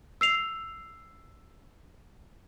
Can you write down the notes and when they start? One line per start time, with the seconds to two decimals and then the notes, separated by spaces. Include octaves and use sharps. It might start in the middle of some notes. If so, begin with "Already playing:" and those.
0.21 E6 C7 F7